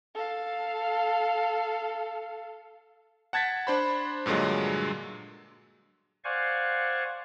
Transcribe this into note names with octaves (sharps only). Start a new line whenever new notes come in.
A4 F5
F#5 A5 G#6 A6 B6
D4 C5 B5
G2 A#2 D3 F#3 G#3
C5 D5 F5 F#5 G#5 C#6